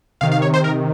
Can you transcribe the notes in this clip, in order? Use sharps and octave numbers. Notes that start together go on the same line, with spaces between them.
C3 D#3 F5
F5
C#5
C5
A#4